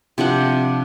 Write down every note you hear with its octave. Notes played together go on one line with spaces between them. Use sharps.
C3 F3 D4 F#5